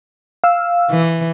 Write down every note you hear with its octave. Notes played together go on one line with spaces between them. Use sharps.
F5 E6
E3